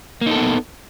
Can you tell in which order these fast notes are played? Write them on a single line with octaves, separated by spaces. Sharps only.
A#3 D#4 A4 B3